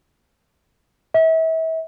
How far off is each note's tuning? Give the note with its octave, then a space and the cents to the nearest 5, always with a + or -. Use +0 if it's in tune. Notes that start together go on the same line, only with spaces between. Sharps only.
E5 -35